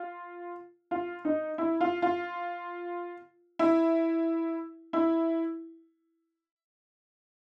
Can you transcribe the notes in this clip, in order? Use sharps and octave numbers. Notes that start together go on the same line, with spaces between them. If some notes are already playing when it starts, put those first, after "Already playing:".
Already playing: F4
F4
D#4
E4
F4
F4
E4
E4